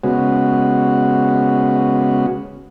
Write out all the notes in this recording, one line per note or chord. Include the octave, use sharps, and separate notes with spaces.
C#3 G#3 B3 F#4